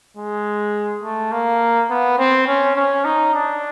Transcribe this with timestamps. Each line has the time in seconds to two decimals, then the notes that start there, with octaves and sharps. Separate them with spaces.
0.17 G#3
1.03 A3
1.31 A#3
1.90 B3
2.19 C4
2.47 C#4
2.76 C#4
3.05 D#4
3.34 D4